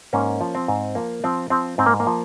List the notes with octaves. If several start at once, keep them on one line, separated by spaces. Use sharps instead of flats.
G#2 A#3 C#4
F3
C4
G#2
F3 A#3
F3 C4
F3 C4
G#2 C4
A#3
A#3
F3